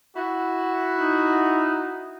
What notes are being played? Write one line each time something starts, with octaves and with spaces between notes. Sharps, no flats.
E4 F#4
D#4